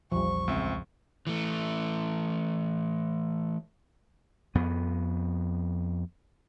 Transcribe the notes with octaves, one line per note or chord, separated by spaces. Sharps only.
A#1 E2 F3 G3 C#6
C#2 C4 E5
E3 A3
F2 B3